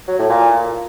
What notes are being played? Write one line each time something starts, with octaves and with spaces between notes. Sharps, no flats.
F#3
A2
A#2